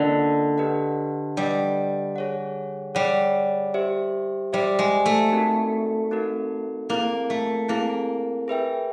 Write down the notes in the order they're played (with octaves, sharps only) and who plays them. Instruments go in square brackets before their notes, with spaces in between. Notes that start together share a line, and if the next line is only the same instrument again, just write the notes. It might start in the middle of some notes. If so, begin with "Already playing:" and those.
Already playing: [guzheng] D3 [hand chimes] A#3 C#4 F4 A#4 D#5
[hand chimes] D4 G4 B4 D#5 F#5
[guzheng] G3 [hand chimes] D4 G4 B4 D#5 F#5
[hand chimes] G#4 C#5 F#5
[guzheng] G3 [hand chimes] G#4 C#5 F#5
[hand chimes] G4 C5 E5
[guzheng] G3 [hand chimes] G4 C5 E5
[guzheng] G#3
A3
[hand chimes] C4 D#4 F#4 A#4
C4 D#4 F#4 A#4
[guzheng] A#3 [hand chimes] C4 E4 G#4
[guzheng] A3
[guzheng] A#3 [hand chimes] C4 E4 G#4
[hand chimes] G#4 B4 E5 G5